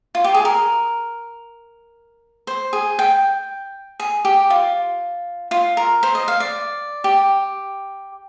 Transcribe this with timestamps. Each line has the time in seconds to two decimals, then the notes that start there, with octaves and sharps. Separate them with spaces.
0.15 F4
0.24 G4
0.34 G#4
0.45 A#4
2.47 C5
2.73 G#4
2.99 G5
4.00 G#4
4.25 G4
4.50 F4
5.51 F4
5.77 A#4
6.03 C5
6.15 D#5
6.28 F5
6.40 D5
7.04 G4